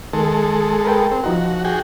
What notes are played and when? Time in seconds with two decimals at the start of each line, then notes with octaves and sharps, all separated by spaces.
0.13 D#3 G#3 A4
0.85 A#4 B4 G5
1.11 C4
1.24 F3 D#4 F#4 C5
1.64 F#4 G#4 G5